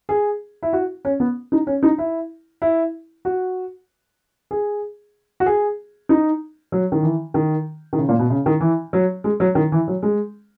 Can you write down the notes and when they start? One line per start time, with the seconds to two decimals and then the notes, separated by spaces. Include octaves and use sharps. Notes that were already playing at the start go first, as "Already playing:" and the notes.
0.09 G#4
0.63 E4
0.73 F#4
1.05 C#4
1.20 B3
1.52 D#4
1.67 C#4
1.83 D#4
1.98 E4
2.62 E4
3.25 F#4
4.51 G#4
5.40 F#4
5.46 G#4
6.09 D#4
6.72 F#3
6.92 D#3
7.03 E3
7.34 D#3
7.93 D#3
7.98 C#3
8.09 A#2
8.19 B2
8.30 C#3
8.46 D#3
8.61 E3
8.93 F#3
9.24 G#3
9.40 F#3
9.55 D#3
9.72 E3
9.88 F#3
10.03 G#3